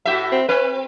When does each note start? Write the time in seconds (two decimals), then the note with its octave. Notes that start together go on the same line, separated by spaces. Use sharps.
0.05 A2 F#4 E5
0.32 C4
0.49 C4 B4